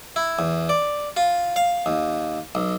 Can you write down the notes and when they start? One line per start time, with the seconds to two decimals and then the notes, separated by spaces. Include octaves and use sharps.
0.16 E4
0.39 E2
0.69 D5
1.17 F4
1.56 F5
1.86 D#2
2.55 B1